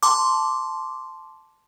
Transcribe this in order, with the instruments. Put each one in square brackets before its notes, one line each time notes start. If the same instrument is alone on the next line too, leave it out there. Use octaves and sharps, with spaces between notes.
[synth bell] A5 C6 D6